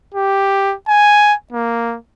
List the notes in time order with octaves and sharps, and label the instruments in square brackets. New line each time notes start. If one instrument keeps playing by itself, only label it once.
[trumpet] G4
G#5
A#3